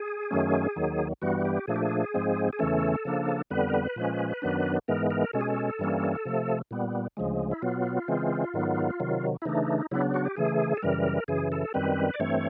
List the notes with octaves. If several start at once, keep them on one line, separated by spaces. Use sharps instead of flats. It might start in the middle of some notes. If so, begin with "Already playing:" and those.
Already playing: G#4
F#2 D#3 F#3 A3 C#4
D#2 D#3 F#3
G2 E3 G3 B3 F#4
G4
A#2 F3 A3 D4 G#4
G4
G#4
G#2 F3 G#3 C4
G#4
E2 C#3 E3 A3 C#4 A4
C#3 F3 A#3 D4
F2 D3 G3 B3 B4
A#4
B4
A#2 F3 G#3 C#4
F#2 D#3 F#3 B3 D4
G#2 E3 G#3 B3 A#4
A#4
B2 G#3 C#4 A4
G#4
A4
G2 E3 G3 A#3 C#4
C3 F3 A3
A#2 G3 B3
D2 C#3 F3 G#3
E4
B2 F#3 B3 F4
C#3 E3 G#3 C4
G#2 D#3 F#3 B3
C3 D#3 F#3
E4
C#3 E3 A3 D4 D#4
C#3 F#3 B3 D4 E4
F#4
G4
C#3 E3 A3 G#4
A4
F#2 C#3 E3 G3 A#4
F#2 C#3 E3 G#4
A4
F#2 D#3 G3 C4 B4
D5
G2 E3 A3 C4 C#5